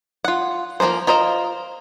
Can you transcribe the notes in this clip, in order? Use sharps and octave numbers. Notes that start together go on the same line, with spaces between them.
F4 F#5
F3 A#3 B3 A#4 C5
F4 A#4 C5 D#5